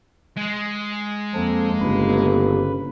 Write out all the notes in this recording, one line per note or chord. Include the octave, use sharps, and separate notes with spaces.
G#3
F2 A#3 C4 A4
G1 C#3 B4